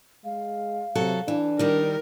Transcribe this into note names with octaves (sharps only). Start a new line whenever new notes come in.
G#3 F5
C3 F#3 F#4 A4
E3 D4
D#3 G3 A#4